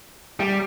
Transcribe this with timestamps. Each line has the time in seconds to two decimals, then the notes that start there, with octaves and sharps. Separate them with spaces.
0.40 G3